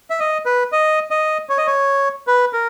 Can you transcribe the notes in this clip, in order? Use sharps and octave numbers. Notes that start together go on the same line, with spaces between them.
E5
D#5
B4
D#5
D#5
C#5
D#5
C#5
B4
A#4